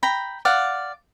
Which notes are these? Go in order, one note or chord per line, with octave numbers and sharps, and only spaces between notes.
G5 A#5 B5
D5 F5 F#5